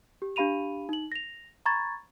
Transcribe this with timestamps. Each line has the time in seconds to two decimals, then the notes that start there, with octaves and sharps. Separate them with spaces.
0.22 G4
0.36 D4 G4 F5 B5 D#7 F7
0.89 D#4 F#7
1.12 A#6 F7
1.66 A#5 B5 C#6 G#6 A6